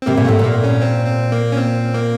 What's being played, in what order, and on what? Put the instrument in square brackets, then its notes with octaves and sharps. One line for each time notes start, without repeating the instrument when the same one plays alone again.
[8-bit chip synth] C4
[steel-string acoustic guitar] C3 [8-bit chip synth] A#3
[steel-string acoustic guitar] A#2
[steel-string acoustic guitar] A2 [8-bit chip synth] A3
[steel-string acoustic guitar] A#2
[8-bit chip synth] A#3
C#4
C4
C4
A#3
C#4
C4
A#3